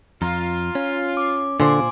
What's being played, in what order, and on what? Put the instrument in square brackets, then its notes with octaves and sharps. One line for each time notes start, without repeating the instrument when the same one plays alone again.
[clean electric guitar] F2 [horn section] F4 [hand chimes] A#5
[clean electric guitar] C#4
[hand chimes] D6
[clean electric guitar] A#2 F4 C5 [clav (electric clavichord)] D3 [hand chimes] G#5 C6 D6